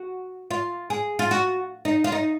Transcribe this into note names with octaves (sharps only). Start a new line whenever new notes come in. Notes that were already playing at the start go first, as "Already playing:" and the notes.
Already playing: F#4
F4
G#4
F4
F#4
D#4
F4
D#4